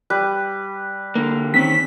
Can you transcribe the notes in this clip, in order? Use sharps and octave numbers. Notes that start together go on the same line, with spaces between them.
G3 B4
D3 A#3
D#3 C4 C#4 B6